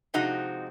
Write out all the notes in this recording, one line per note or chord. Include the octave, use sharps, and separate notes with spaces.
C3 F3 G#3 C4 D#4 F#4